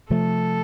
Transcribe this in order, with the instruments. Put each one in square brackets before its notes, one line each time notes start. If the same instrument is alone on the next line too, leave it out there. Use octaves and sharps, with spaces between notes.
[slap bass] C3 F3 A3 [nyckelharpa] A4